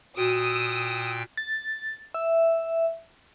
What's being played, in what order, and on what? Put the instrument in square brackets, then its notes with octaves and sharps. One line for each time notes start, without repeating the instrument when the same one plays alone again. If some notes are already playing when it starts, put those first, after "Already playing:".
[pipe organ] A#2 G5 [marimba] F#4 [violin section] D#6 E6
[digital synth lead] A6
E5